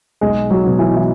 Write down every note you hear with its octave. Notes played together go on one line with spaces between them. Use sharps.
B1 G#3
F#3
B2 F#3
E3
E3